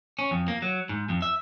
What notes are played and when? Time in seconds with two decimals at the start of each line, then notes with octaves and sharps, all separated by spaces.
0.19 C#4
0.31 F2
0.48 A#3
0.62 F#3
0.89 G#2
1.09 F2
1.22 E5